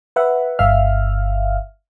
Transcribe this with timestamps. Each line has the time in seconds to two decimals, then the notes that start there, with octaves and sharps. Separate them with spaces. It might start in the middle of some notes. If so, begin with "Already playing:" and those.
0.16 B4 E5 F#5
0.59 G1 E5 F5 F6